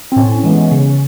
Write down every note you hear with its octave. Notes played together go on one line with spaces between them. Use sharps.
C4
A2 C#4
E3 G#3 B3
C#3